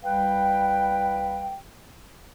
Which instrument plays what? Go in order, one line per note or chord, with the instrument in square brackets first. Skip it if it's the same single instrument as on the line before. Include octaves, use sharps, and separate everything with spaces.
[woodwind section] C2 G3 B4 F5 G5